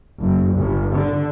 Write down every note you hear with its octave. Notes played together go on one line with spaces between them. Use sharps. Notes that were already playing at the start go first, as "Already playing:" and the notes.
F#1
G1
D3